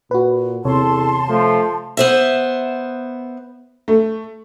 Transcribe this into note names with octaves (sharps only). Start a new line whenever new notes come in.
A#2 F#4 B4
E2 C3 A4 C#5 A5 C6
F3 A3
B3 C5 E5
A3